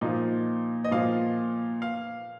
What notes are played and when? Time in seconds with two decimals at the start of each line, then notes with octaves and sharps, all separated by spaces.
0.01 A#2 F3 D#4
0.84 D#5
0.91 A#2 F3 F5
1.82 F5